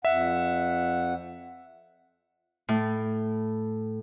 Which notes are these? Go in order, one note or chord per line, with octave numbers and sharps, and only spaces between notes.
F2 E5 F#5
A2